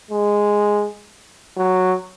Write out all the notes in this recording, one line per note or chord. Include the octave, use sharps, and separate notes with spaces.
G#3
F#3